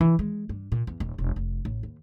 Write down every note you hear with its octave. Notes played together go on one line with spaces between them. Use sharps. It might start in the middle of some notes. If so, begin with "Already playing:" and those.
E3
G#3
G2
A#2
E2
D#1
E1
F1
A1
D#2